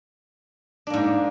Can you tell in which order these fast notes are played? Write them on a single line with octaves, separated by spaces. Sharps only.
D4 A#3 G#2